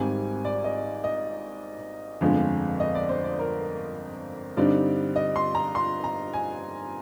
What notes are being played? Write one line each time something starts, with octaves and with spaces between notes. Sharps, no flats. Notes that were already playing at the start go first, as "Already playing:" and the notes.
Already playing: G#1 G#2 G3 C4 D#4 G#5
D5
D#5
D#5
G1 F2 D3 F3 G#3
D#5
D5
C5
D5
A#4
G2 D3 G3 C4 D#4 D5
D#5
C6
A#5
C6
A#5
G#5